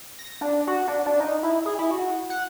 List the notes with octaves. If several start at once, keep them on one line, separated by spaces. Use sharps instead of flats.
A#6
D4
F#4
D4
D4
D#4
E4
G#4
E4
F#4
F#5